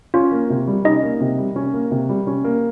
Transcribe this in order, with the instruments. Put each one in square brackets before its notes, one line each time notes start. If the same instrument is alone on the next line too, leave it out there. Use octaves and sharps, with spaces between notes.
[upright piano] C#4 [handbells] F4
[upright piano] A#3
C3
G3
[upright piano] C#4 [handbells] D#4 D#5
[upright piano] A#3
C3
G3
C#4
A#3
C3
G3
C#4
A#3